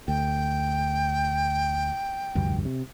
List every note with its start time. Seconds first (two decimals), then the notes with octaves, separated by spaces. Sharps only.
0.08 D2 G5
2.35 F1 D2 G2
2.65 C3